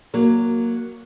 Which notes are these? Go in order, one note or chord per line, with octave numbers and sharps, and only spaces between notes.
F#3 A#3